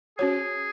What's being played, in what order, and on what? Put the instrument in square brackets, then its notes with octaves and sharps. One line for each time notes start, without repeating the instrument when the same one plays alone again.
[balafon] C#4 F#4 C#5 [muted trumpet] G#4